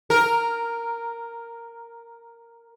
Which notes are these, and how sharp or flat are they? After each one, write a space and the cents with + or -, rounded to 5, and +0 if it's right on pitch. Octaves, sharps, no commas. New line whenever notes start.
A#4 -5